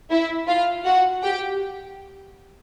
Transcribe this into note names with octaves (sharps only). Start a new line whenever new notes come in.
E4 E5
F4 F5
F#4 F#5
G4 G5